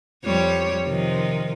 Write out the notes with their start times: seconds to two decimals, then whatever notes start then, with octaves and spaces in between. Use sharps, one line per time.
0.25 F2 G3 C#5
0.84 C3 D#3 F3